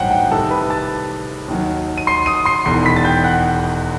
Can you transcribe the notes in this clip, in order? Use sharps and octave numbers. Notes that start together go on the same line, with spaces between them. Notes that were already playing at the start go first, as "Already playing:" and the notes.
Already playing: A1 G2 D#3 F#3 C5 F#5 G5
G5
C2 C3 D#3 A4 A5
B4 B5
A5 A6
D#2 D#3 F#3
D#7
C6 C7
D#6 D#7
C6 C7
E1 E2 D#3 C6 C7
B5 B6
A6
G5 G6
F#5 F#6